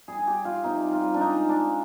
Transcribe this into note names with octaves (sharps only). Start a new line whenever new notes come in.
G3 G#4
G#4
G3 G4
G3 F4
C3 D#4
G3
F4
G3
D4
G#3 D#4
G#3
D4
G#3